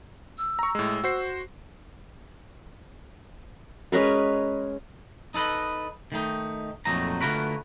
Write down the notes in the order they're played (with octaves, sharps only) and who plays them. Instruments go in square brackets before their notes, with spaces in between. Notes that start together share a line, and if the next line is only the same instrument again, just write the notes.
[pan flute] E6
[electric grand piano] A#5 C#6
A2 G#3
F#4 C5 C7
[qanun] G#3 C#4 A#4 B4
[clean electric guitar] D#4 A4 B4 D#5
D#3 A3 D#4
F2 A#2 F#3 A3 D#4 A#5
D3 A3 F4 F#4 A#4 B4